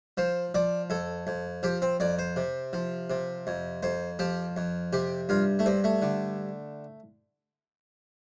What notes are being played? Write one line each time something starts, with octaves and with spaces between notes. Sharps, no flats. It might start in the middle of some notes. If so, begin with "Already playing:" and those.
F3 C5
F3 D5
F2 A4
F2
F3 G4
C4
F2 D5
C5
C3
F3
C3
F2
F2 C5
F3 G4
F2
C3 G4
G2 F4
A3
G2 C4
A3
D3